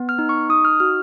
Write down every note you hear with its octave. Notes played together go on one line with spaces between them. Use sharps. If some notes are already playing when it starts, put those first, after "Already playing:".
Already playing: B3
F6
D#4
C#6
D#4 D#6
F6
F#4 F6